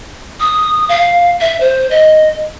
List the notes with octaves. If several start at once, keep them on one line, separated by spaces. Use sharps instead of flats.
D#6
F5
E5
C5
D#5